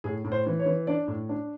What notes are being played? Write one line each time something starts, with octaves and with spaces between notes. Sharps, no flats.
A2 G#4
A2
C5
E3
C#5
E3
D4 D5
A2
D4